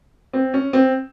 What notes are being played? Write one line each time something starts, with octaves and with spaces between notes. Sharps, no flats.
C4
C#4
C4